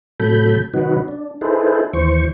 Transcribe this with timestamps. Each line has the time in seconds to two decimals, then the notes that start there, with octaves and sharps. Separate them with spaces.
0.20 A2 C3 F#3 A4 B5 G6
0.74 C3 D#3 F#3 D#4 F#4 B4
1.08 D4
1.41 D#4 E4 G#4 A4 B4 C5
1.93 D#2 E3 C5 C#6